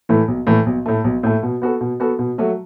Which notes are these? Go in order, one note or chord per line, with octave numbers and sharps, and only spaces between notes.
A2 E3 A3
B1
A2 E3 A3
B1
A2 A3
B1
A2 A3
B2
B3 F#4 A4
B2
B3 F#4 A4
B2
F#3 A3 F#4